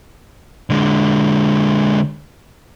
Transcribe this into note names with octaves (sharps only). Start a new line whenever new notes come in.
D3 G#3